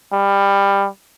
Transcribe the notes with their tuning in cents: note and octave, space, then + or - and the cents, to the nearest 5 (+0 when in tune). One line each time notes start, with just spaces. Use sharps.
G3 +20